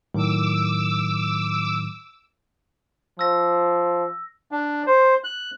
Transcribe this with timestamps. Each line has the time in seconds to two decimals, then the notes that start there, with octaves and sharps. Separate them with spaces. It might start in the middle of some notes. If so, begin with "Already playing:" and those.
0.15 A2 D#3 F#3 D6 E6
3.19 F3 E6 A#6
4.51 D4
4.87 C5
5.24 F#6